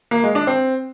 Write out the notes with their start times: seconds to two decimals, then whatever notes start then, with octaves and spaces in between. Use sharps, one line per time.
0.11 A#3
0.23 G#3
0.35 D4
0.47 C4